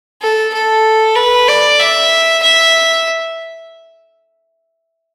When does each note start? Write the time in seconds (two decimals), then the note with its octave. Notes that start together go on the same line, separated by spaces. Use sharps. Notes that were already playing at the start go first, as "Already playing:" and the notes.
0.21 A4
0.53 A4
1.15 B4
1.48 D5
1.79 E5
2.42 E5